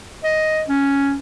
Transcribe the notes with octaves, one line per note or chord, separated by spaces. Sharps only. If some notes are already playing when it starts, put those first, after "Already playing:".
D#5
C#4